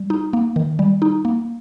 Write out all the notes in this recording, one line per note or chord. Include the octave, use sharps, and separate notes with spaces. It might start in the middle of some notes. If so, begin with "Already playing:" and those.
Already playing: G3
D#4
A#3
D#3
G3
D#4
A#3